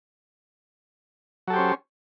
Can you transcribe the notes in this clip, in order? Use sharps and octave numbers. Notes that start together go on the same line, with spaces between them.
F#3 C#4 G4 A4 C5